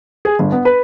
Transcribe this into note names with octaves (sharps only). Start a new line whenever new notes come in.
G#4
G1
B3
B4